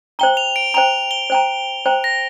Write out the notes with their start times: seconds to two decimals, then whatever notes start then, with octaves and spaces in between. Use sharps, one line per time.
0.19 C5 G5 A#5 G7
0.37 F7
0.56 D7
0.74 C5 G5 A#5 F7
1.11 G7
1.30 C5 G5 A#5
1.86 C5 G5 A#5
2.04 A#6